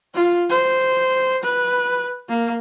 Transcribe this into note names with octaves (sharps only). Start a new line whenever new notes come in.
F4
C5
B4
A#3